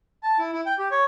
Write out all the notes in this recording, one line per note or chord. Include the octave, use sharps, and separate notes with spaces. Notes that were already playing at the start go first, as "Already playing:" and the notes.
A5
E4
E4
G5
G4
C#5